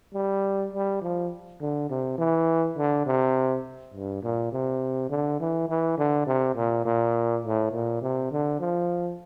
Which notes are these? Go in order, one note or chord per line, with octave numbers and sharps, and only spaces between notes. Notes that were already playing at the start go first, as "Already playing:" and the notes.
G3
G3
F3
D3
C3
E3
D3
C3
G2
A#2
C3
D3
E3
E3
D3
C3
A#2
A#2
A2
A#2
C3
D3
F3